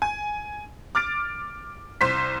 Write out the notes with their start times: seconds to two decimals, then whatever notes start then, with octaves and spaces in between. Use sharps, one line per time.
0.02 G#5
0.95 D6 F6 A6 D7
2.01 C2 C5 C6 B6